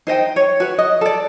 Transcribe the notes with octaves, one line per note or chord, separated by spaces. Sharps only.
D#4 C5 D#5 G5
C#5
F#4 B4
D#5
A4 D5